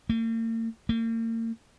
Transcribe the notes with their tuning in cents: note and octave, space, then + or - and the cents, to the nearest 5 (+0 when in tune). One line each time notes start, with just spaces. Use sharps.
A#3 -45
A#3 -40